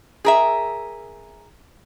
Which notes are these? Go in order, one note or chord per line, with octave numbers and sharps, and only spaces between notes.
G#4 A#4 E5